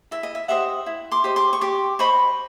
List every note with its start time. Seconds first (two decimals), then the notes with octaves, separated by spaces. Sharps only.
0.11 E4 E5
0.23 D#5
0.35 E5
0.48 G4 C5 D#5 E5 F#5
0.86 E4
1.12 C6 D6
1.24 G4 C5 D#5
1.36 C6 D6
1.53 C#6
1.61 G4 C6 D6
1.99 C5 D#5 B5 C#6